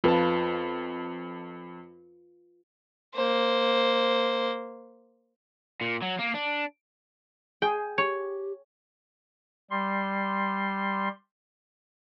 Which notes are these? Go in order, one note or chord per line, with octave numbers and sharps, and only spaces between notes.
F2 F4 B4 A5
A#3 C5
A#2
F#3
A#3
D4
G#4 G5
G4 C#5
G3 C6